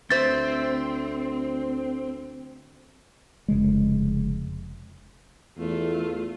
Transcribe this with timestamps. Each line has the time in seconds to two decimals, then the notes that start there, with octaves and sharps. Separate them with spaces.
0.10 D2 C4 C5 E5 A6
3.48 F1 C#3 G#3
5.58 E2 A3 F4